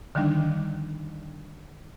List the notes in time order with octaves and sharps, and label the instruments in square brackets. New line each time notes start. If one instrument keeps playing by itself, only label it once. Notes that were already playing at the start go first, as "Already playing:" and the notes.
[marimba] D3 D#3 F3 G3 D4 D#4